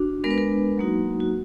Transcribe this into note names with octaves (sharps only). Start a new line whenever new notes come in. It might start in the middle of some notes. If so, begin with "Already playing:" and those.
Already playing: D4 F#4
G#3 B3 D4 A#4
B4
A#4
F#3 A#3 D#4 F#4
F#4